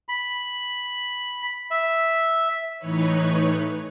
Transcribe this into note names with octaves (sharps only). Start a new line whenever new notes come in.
B5
E5
A2 E3 D#4 B4 C#5